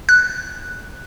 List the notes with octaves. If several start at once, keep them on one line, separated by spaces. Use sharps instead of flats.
F#6